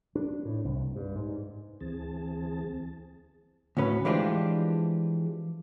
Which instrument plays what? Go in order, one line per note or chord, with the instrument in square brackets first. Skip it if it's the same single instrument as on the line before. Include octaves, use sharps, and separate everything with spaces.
[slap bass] D4
A2
C2
G2
G#2
[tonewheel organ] D2 E3 C4 G#4 A5
[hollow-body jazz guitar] D2 A2 C#4 B4
E3 F3 G#3 D4 F4 G4